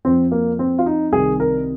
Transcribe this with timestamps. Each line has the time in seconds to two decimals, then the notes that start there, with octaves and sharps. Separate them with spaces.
0.05 F2 F3 C4
0.32 A#3
0.59 C4
0.79 F4
0.86 D#4
1.12 C2 C3 D#3 G#4
1.40 A#4